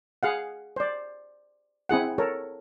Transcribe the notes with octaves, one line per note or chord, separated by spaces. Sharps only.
G#4 F5 F#5
C5 D5
C4 E4 G#4 F#5
A4 A#4 C#5